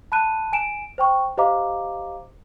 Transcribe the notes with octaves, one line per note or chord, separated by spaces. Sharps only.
A5 B5 F#6 D#7
G#5 D7 E7
C5 G5 C#6
G4 C5 D#5 F5 A#5 D6